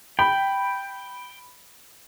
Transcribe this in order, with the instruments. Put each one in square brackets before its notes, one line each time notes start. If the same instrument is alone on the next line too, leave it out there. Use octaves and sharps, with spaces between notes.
[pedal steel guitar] G5 [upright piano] B5